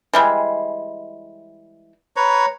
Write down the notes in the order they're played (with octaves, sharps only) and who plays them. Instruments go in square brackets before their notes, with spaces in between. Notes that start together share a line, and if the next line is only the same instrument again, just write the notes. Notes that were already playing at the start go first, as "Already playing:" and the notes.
[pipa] E3 G3 G#3
[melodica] B4 C#5 A#5